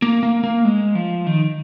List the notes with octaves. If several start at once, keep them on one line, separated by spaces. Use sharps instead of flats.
A#3
A#3
A#3
G#3
F3
D#3